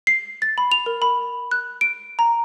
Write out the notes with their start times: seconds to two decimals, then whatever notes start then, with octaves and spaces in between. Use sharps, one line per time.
0.07 C7
0.42 A6
0.58 B5
0.72 F7
0.86 A#4
1.02 B5
1.51 F#6
1.81 D7
2.19 A#5